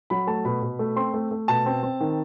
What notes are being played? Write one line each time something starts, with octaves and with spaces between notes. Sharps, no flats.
F#3 B5
A3 A5
B2 B5
B2
A3
C4 C6
A3
A3
B2 A5
C4
C4
D#3